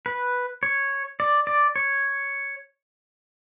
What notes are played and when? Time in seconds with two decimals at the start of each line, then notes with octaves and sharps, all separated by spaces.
0.06 B4
0.63 C#5
1.20 D5
1.47 D5
1.76 C#5